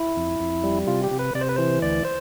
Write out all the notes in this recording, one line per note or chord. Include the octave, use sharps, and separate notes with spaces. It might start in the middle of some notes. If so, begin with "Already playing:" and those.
Already playing: E4
F2
F2
G3
C3 F4
G4
C3
B4
C3 D5
C5
B4
E3 C5
D2 D5
C5